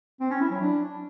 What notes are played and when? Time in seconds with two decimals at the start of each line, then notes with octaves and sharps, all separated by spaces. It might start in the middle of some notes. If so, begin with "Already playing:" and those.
0.20 C4
0.30 C#4
0.41 E4
0.51 F#3
0.61 D4